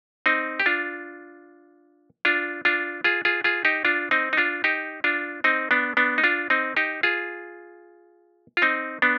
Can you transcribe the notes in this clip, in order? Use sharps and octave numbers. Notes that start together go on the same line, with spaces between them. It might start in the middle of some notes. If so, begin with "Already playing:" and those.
C4 D#4
G4
D4 F4
D4 F4
D4 F4
F4 G#4
F4 G#4
F4 G#4
D#4 G4
D4 F4
C4 D#4
D#4
D4 F4
D#4 G4
D4 F4
C4 D#4
B3 D4
B3 D4
D#4
D4 F4
C4 D#4
D#4 G4
F4 G#4
F4
C4 D#4
B3 D4